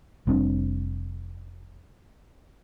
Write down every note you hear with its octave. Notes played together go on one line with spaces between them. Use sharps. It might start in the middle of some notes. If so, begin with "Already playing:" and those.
F1 G3 C4 D4